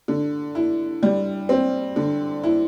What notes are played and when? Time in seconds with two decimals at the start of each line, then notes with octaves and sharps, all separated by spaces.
0.08 D3
0.55 E4
1.03 G3
1.49 C4
1.96 D3
2.43 E4